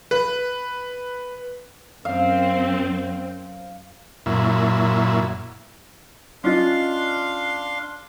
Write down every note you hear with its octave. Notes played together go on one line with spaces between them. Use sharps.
B4
F#2 C4 F5
F#2 A#2 E4
C#4 D4 F4 D#5 F5 C6